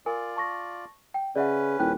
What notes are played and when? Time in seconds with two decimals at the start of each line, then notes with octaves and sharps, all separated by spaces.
0.06 F4 A#4 D5 G#5
0.37 A5 C#6 A#6
1.14 G5
1.36 C#3 C#4 B4 D5 E5 F#5
1.79 D#1 E4 G5 F#6